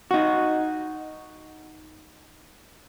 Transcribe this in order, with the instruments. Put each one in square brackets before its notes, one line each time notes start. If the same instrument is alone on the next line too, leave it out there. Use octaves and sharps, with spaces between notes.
[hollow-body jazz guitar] D#4 F#4